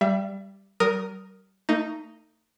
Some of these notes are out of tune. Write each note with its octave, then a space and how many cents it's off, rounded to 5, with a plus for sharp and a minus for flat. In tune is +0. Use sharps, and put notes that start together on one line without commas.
G3 +0 E5 +35
G3 -45 A#4 +0 D#6 +0
A3 +40 D#4 +0